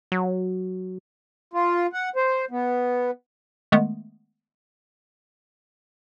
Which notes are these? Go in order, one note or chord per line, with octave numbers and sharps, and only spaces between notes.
F#3
F4
F#5
C5
B3
D#3 G#3 A3 B3